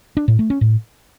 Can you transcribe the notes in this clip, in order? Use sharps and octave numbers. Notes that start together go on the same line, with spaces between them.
D4
A2
A3
C#4
A2